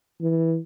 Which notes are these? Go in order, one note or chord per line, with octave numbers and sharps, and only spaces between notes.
E3